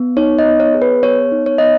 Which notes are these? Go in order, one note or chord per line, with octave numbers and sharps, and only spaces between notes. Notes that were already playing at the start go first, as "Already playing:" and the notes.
Already playing: B3
D#4 C#5
D#5
B3
C#5
G#4
B4
B3 C#5
D#4
C#5
B3 D#5